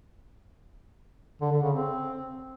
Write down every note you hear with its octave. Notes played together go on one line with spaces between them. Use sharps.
D3
D3
C#3
C4